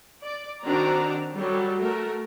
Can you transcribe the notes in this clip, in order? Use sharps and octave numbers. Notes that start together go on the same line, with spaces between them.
D5
D#3 C4 D4 F#4 D5 A#5
F#3 G3 G4 A4
A3 F#4 A#4